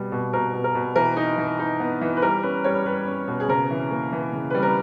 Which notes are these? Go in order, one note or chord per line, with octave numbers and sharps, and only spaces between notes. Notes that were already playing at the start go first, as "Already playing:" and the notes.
Already playing: B2 G3
B2
B2 A#4
B2
A#4
B2
E3 A#4
D#4
E3
D#4
B3
E3
B4
G3 A#4
C#4 B4
G3 C#5
G3 B4
C#4
B2
G#4
C#3 A#4
E3
A#3
E3
C#3
G3 B4
A#4